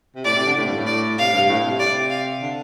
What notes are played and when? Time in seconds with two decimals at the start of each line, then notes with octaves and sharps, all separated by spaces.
0.16 C3
0.25 A2 D5
0.36 C3
0.46 D3
0.56 A2
0.66 G2
0.77 A2
0.86 D5
1.18 C3 F5
1.33 G2
1.49 A2
1.63 C3
1.79 D5
2.10 F5
2.42 D3